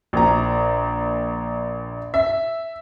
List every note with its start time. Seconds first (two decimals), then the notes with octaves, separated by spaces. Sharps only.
0.13 A#1 A#5
2.14 E5